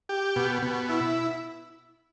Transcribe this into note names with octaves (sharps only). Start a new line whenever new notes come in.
G4
B2
B2
E4